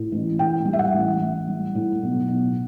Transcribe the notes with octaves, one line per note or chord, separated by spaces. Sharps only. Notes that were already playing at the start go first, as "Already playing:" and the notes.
Already playing: A2
A1
A2 G5
G3
E5
F#5
A1
A1
G3
A2
B1
B1